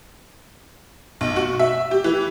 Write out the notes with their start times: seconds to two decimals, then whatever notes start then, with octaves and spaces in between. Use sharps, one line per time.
1.21 B1
1.36 F#4
1.59 E5
1.91 G4
2.04 E3